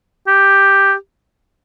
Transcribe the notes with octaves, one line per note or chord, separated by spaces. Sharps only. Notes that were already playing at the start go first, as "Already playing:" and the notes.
G4